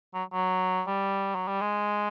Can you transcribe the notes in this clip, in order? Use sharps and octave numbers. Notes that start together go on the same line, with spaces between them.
F#3
F#3
G3
F#3
G3
G#3